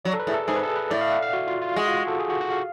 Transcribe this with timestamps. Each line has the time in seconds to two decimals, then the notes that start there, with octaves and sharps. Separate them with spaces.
0.05 F#3 D5
0.14 A4
0.19 B4
0.27 A2 G#4
0.34 A4
0.48 G#2 G#4
0.56 B4
0.63 A4
0.76 B4
0.90 A2 D5
1.01 F5
1.12 F#5
1.23 F5
1.33 F#4
1.48 F4
1.61 F4
1.76 G#3 F#4
1.87 F4
1.97 F#4
2.08 A4
2.19 G#4
2.29 F#4
2.41 F#4
2.51 F5